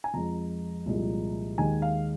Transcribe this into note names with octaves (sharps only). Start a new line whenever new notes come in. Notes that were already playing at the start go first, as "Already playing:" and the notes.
G#5
F2 F3 G#3 A#5
C2 A#2 F3 G#3
D#2 D#3 G#3 G#5
F5